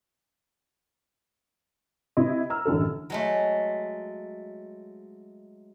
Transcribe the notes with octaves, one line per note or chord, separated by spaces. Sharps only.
C3 E4 D#5
A#5 E6 F6
A1 F#2 D3 A4
F#3 G#3 A3